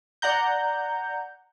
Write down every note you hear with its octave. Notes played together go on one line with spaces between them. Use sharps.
D5 F#5 A#5 G6